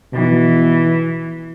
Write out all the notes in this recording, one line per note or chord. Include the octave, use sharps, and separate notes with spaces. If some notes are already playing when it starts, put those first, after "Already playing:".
B2 E3